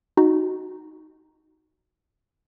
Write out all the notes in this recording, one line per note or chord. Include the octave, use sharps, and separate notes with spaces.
D#4 F#4